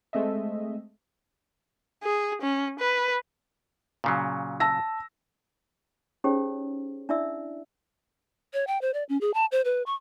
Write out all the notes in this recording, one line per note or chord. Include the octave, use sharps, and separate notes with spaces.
G#3 A3 C4 D#5 E5
G#4
C#4
B4
A#2 C#3 F#3
A5 E6 A#6
C#4 D#4 G4 G#4 C5 C#5
D4 E4 D5 E5 E6
C#5
G5
C5
D5
C#4
G#4
A5
C5
B4
C#6